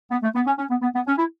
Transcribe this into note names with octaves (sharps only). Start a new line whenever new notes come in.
B3
A3
B3
C#4
C#4
B3
B3
B3
C#4
E4